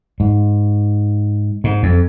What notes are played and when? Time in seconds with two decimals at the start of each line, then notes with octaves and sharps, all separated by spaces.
0.20 G#2
1.64 G#2
1.83 F2